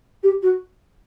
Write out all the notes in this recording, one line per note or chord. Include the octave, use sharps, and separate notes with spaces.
G4
F#4